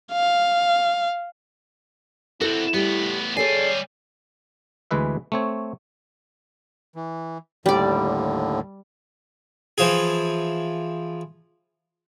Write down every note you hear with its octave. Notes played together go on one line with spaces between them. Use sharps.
F5
C4 E4 F#4 A4
A2 G3 B3
G3 G#4 A4 C#5 D5 G#5 C7
D2 E3 G#3 B4 E5
A3 C4 C#5
E3
D#2 A2 D3 G3 D5
E3 F3 G#4